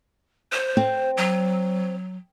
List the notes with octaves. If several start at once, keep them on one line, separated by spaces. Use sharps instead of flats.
C5
C4
F#3